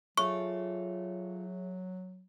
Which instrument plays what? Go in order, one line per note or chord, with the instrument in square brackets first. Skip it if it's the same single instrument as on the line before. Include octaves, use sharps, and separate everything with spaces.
[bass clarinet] F#3 [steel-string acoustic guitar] F4 A4 [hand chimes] G#4 C#5 E5 [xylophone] C#6